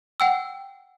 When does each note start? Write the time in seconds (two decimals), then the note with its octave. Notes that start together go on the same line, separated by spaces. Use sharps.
0.20 F#5 G5 E6